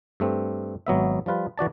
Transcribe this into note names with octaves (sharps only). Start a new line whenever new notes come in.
G2 A3 C4
G#1 F#3 B3 E5
F3 G3 F4 B4
E3 F#4 D5 A5